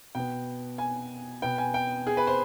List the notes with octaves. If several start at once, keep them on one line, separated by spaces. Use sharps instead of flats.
B2 B3 G5
G#5
B2 B3 G5
G#5
G5
G#4
B4
C5